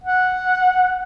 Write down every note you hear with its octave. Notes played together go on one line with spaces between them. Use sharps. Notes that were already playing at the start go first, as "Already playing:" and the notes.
F#5